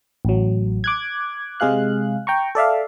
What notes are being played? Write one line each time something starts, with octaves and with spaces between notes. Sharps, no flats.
A1 F#3
D6 F#6 G#6
C3 G#3 G#4 F5 F#6
G5 A#5 C#6
A4 D5 E5 F5